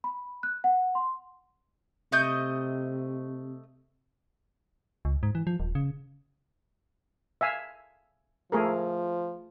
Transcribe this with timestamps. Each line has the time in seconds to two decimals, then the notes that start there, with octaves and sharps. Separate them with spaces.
0.04 B5
0.43 F#6
0.64 F#5
0.95 C6
2.12 C3 A3 D#5 G6
5.05 C#2
5.23 G#2
5.35 E3
5.47 F3
5.60 D#1
5.75 C#3
7.41 E5 F5 G#5
8.52 F3 A3 G#4 A#4